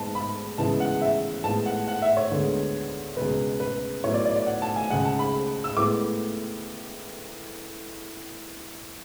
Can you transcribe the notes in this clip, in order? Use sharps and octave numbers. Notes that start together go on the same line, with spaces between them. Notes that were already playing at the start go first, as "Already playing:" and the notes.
Already playing: G#2 G#3 B3 A5
B5
C#2 C#3 E3 G#3 B3 A5
F#5
E5
A2 G#3 B3 A5
F#5
F#5
E5
C#5
D2 D3 G#3 B3
C#2 B2 G#3 B4
B4
A2 F#3 B3 C#5
D5
D5
D5
F#5
A5
G#5
C#2 C#3 G#3 F#5
A5
B5
E6
A2 G#3 B3 D6